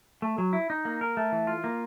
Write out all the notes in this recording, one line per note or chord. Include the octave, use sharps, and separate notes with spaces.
A3
F#3
E4
D#4
A#3
A#4
A3
E3
F4
A#3